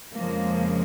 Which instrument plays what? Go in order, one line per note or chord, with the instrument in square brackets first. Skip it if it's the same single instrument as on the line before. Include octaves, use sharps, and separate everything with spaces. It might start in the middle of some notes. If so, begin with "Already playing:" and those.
[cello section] F2 C#3 F3 G#3 A#3